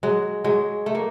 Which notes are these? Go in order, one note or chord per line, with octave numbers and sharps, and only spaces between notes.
F#3 G#3
F#3 G#3
A3
A#3